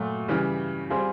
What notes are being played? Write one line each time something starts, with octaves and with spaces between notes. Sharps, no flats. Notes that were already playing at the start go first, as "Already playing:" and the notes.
Already playing: A#2 F#3 A3
C#3 E3 G3
G3 C4 F4 G#4 C5